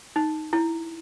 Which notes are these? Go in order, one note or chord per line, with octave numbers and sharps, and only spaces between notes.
D#4
E4